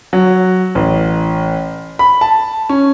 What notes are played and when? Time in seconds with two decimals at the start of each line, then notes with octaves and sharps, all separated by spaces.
0.13 F#3
0.75 A1
1.99 B5
2.21 A5
2.69 C#4